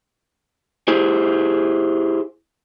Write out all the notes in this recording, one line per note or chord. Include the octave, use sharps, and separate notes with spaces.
E4 G4 G#4 C5